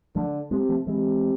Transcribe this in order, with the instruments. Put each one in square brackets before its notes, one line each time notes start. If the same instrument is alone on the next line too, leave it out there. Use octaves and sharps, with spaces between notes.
[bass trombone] D3 [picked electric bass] F3 A3
[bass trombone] C3 [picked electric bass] G#3 B3
[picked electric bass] F3 A3
[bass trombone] C3 [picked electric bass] E3 G#3